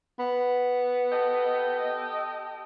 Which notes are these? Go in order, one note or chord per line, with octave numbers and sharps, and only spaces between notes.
B3
G4 A4 D#5